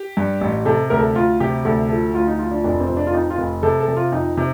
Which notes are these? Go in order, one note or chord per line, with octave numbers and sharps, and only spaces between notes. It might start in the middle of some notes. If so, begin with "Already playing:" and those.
Already playing: G4
G2
A1
C3 A4
D2 A#4
A4
D2 F4
C3 G4
D2 A4
F3 A4
D2 F4
D#4
F3 F4
D4
F1 D4
C4
F1
D4
F4
F2 D#4
F4
F1
C3 A4
A4
C3
F4
F2 D#4
C3